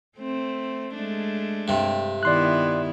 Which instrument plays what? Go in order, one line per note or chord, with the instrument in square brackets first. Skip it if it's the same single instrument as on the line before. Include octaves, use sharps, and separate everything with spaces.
[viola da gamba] A3 C4
G#3 A3 D4
[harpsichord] G2 C3
[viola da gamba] D#3 B3 E4 [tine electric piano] D5 C6 F#6